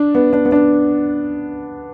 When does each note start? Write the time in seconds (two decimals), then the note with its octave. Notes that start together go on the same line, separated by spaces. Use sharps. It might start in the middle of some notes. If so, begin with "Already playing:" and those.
Already playing: D4
0.15 B3
0.33 D4
0.45 B3
0.52 D4